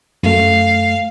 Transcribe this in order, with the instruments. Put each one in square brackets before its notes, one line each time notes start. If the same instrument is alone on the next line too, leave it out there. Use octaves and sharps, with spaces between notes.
[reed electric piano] F#2 A3 [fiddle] F5